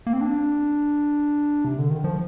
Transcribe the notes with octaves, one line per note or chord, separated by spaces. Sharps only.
A#3
C4
D4
C3
D3
D#3
F3